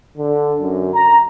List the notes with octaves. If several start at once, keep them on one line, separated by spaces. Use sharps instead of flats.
D3
F#2
A#5